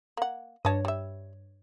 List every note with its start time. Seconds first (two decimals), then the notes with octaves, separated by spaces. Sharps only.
0.17 A#3 F#5
0.65 G2 C#5 D#5 A5
0.85 G3 E5